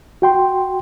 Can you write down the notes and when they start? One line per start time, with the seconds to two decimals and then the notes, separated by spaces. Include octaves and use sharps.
0.22 F#4 G5 C6